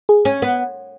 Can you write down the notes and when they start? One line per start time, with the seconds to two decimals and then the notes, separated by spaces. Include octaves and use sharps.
0.09 G#4
0.25 C#4
0.42 B3